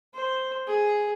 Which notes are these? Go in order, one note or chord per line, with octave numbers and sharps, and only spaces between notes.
C5
G#4